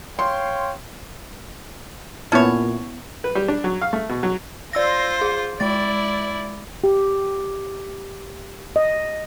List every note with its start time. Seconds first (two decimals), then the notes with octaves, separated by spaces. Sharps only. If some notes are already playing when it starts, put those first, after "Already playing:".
0.19 C#5 F5 G5 C6
2.32 A#2 B3 C#4 E4 C#5 A5
3.24 B4
3.35 G3
3.48 D4
3.64 F#3
3.81 F5
3.93 A3
4.09 B2
4.23 F#3
4.73 F4 C5 D5 E6 A#6
5.21 G#4
5.60 G#3 E4 D5 A6
6.84 G4
8.76 D#5